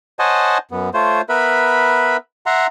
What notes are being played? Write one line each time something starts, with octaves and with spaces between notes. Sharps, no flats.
C5 C#5 D#5 F#5 G#5 A5
F#2 B3
A3 F4 C5 C#5
B3 A#4 B4 E5 B5
E5 F#5 A#5 C6